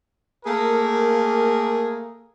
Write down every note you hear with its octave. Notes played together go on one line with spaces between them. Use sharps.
A3 A#3 G#4 A#4